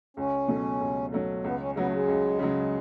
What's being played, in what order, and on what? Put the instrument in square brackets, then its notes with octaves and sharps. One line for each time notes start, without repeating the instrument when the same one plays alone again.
[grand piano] C#2 [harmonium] C#4
[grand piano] B2 F#3 A3
C#2
B2 F#3 A3
[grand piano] C#2 [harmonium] B3
[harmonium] C#4
[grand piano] C#3 F#3 [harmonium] B3
[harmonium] A3
G#3
[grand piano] C#2
C#3 F#3